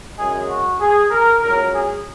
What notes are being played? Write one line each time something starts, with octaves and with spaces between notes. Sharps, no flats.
F#2 C#3 G#3 G#4
F#4
G#4
A#4
C#2 C#3 F#3 A#4
G#4